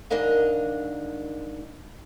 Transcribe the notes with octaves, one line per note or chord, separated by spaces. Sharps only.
G#2 D#3 D4 A#4 D#5 F5